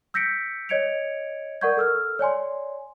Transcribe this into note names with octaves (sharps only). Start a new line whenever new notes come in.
E6 G6 A#6 B6 C#7 D7
C#5 D#5 G#6 C#7 D7 F7
A#4 D5 F#5 C#6 G6 G#6
A4 E6 F6
C#5 D5 G#5 C6